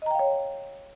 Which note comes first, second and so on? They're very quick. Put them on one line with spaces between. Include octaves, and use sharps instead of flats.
D#5 A#5 G5 F5 C#5